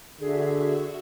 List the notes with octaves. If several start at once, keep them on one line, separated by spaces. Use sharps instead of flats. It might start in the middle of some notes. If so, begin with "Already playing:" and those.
D3 F#4 G#4 E5